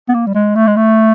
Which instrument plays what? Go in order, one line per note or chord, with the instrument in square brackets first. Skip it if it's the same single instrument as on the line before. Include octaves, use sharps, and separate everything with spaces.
[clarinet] B3
A#3
G3
G#3
A3
G#3
A3